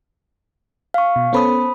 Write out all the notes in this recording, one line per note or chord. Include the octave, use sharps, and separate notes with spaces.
F5 C#6
B2
B3 C#4 A4 C5 B5 D#6